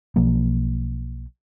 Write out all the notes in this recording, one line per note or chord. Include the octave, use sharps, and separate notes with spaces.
B1 F3 A#3